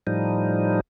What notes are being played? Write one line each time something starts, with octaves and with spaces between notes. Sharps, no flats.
A2 F3 G3 D#4